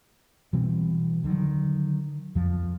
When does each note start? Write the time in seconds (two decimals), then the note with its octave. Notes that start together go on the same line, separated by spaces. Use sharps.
0.53 B2 E3 G3 C4
1.24 D3 D#3 F#3
2.35 F2 F3